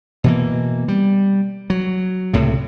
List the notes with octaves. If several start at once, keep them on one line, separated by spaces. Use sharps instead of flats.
B2 E3 A#3
G3
F#3
C#2 A2 C3